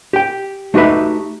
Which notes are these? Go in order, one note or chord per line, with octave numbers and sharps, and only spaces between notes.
G4 G5
A3 D#4 F#4 G4 B4 E5